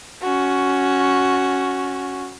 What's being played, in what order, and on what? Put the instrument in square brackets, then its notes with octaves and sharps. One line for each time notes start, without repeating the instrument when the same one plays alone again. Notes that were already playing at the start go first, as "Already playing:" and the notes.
[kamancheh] C#4 F#4